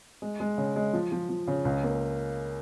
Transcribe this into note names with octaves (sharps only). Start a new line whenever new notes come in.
G#3
G#3
C#3
G#3
F3
F3
F3
C#3
C#2
A#3